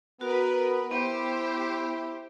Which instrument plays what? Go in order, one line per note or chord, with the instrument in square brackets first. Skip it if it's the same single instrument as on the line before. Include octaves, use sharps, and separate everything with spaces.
[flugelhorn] B3 [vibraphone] F#4 [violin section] A#4 B4
[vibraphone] B3 [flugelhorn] E4 [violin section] G4 C5